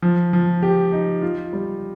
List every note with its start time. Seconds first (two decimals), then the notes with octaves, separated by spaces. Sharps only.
0.02 F3
0.33 F3
0.63 G4
0.92 D#4
1.22 F4
1.53 G3